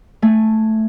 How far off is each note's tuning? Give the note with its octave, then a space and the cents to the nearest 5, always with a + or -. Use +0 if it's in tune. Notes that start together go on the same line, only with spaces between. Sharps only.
A3 +0 G#5 +0